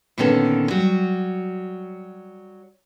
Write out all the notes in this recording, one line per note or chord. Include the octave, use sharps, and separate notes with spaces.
A#2 D3 D#3 B3 C#4 A4
F#3 G3 F#4